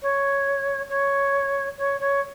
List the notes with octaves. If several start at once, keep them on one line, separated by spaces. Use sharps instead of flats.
C#5
C#5
C#5
C#5